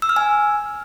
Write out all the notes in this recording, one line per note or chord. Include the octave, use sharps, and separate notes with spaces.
E6
F6
G#5